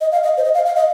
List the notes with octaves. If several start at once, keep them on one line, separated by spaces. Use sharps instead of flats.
D#5
F5
D#5
C5
D#5
F5
F5
D#5